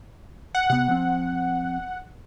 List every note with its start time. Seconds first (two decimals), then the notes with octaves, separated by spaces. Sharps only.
0.55 F#5
0.70 C3 B3 F#5
0.88 F3 C4